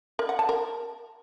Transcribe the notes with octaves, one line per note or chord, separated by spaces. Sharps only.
A#4
F#5
A5
A#4